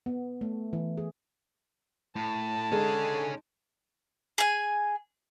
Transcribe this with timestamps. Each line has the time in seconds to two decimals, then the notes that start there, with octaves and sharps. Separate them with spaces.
0.06 B3
0.41 A3
0.73 E3
0.97 G#4
2.16 A2 A5
2.72 D3 G#3 C#4 D#4 G#4
4.38 G#4 G#5